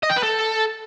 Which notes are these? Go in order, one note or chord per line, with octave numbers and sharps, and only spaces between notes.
D#5
G5
B4
A4